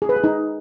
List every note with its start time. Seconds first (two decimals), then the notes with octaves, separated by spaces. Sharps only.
0.02 G#4
0.09 B4
0.16 G#4
0.24 D#4